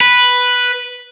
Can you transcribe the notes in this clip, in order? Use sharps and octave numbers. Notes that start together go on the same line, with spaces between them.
B4